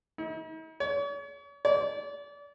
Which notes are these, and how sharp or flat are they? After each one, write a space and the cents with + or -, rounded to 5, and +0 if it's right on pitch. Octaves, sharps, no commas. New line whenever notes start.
D#4 +45
C#5 +40
D5 -35